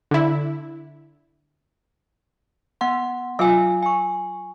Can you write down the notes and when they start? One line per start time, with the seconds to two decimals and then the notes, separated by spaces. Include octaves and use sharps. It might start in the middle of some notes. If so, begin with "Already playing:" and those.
0.11 D3 E4
2.81 B3 F#5 C6
3.39 F#3 F4 F5 G#5
3.83 G#5 C#6